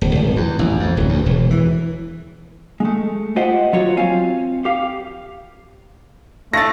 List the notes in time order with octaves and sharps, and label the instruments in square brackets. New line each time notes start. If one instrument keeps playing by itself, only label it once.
[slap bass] D1
G#1
E2
A1
F2
D1
D2
E1
E3
[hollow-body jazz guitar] G#3 A3
F4 G4 C5 D#5 E5 F#5
F#3 F4 F#4 C#5
C4 F4 F5 G#5
G4 F5
[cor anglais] A3 [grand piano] A6 A#6